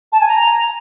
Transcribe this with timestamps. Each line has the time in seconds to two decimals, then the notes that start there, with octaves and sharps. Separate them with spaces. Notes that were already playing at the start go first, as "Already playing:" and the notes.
0.12 A5
0.20 G#5
0.28 A#5